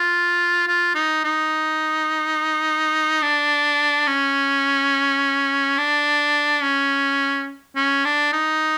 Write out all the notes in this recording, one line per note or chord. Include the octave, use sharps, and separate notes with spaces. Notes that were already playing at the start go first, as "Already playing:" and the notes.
Already playing: F4
F4
D#4
D#4
D4
C#4
D4
C#4
C#4
D4
D#4